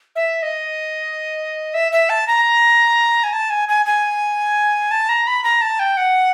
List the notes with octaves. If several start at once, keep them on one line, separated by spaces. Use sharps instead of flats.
E5
D#5
E5
E5
A5
A#5
G#5
A5
G#5
G#5
G#5
A5
A#5
B5
A#5
A5
G5
F#5